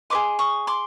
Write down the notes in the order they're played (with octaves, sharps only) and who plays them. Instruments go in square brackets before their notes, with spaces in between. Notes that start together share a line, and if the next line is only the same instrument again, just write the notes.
[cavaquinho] G#4 B4 D#5 C6 D6
C#6 D#6
C6 D6